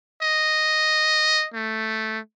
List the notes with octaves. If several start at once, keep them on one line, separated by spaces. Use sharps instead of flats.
D#5
A3